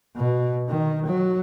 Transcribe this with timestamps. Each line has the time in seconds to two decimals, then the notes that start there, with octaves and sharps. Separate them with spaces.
0.16 B2
0.69 D#3
1.05 F#3